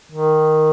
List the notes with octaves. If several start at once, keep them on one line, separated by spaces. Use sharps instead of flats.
D#3